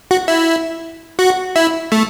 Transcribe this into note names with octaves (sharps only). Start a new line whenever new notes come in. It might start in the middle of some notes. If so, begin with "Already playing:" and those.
F#4
E4
F#4
E4
A3